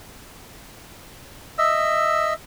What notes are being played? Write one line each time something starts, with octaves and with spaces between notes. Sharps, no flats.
D#5 E5 E6